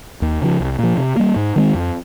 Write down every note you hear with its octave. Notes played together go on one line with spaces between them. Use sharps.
D#2
C#3 F3
C2
A#2 F3
C3
G3 A#3
G#2
D#3 G#3 C4
F2